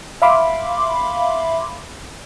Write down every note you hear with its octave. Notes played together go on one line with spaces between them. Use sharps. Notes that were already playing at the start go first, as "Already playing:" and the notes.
E5 F5 B5 C6 D6